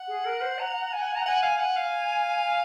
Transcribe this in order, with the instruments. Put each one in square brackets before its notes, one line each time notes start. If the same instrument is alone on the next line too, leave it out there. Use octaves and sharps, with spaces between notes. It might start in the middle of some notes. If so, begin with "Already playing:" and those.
Already playing: [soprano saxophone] F#5
[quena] G#4
A#4
C5
A#5
G#5
A#5
[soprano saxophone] F#5 [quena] G#5
[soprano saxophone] F5
[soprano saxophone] F#5 [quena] G#5
[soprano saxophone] F5